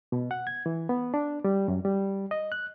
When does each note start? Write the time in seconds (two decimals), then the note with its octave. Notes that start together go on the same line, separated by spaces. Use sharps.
0.12 B2
0.31 F#5
0.47 G#6
0.66 E3
0.89 B3
1.14 D4
1.44 G3
1.68 F#2
1.85 G3
2.31 D#5
2.52 F#6